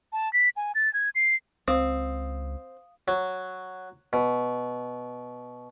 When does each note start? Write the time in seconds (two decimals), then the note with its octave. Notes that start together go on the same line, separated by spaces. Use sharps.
0.13 A5
0.33 B6
0.57 G#5
0.75 A6
0.94 G#6
1.15 C7
1.68 C#2 C4 F5 D#6
3.08 F#3
4.13 B2